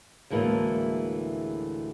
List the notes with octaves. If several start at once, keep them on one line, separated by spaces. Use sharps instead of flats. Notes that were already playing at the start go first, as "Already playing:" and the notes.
D2 A2 E3 G#3 A#3